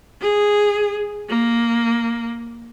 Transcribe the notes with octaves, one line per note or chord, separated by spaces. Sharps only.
G#4
A#3